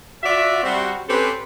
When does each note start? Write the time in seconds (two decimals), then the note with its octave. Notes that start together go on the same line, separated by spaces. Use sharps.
0.23 F4 F#4 D5 E5
0.64 G3 C4 F#4
1.09 C4 C#4 G4 A4 B4